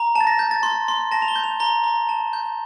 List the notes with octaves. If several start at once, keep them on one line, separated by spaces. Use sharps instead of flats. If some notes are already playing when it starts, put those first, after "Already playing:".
Already playing: A#5
A5
A6
A#6
G6
A6
C6
C6
A5 A#6
F7
G7
G6
F7
A#5 G7
A#5
A5
G6